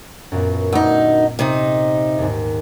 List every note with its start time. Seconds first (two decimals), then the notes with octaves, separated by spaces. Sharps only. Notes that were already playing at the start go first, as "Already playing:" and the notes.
0.32 F#2 A#2 B3
0.73 D2 D#4 E6 G6
1.39 C3 D#4
2.18 D#2 G#2